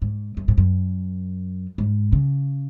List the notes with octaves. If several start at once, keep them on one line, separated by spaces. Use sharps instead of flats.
G#2
F#2
G#2
F#2
G#2
C#3